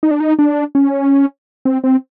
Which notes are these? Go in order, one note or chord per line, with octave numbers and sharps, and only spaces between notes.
D#4
D4
D#4
D4
C#4
C4
C4